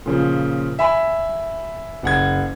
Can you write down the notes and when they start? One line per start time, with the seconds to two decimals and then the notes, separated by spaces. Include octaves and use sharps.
0.06 A#2 C#3 F3
0.79 E5 G#5 B5
2.03 F#1 F#5 G#6